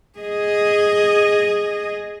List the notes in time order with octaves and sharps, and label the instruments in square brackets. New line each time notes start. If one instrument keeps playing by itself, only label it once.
[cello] G#4 D#5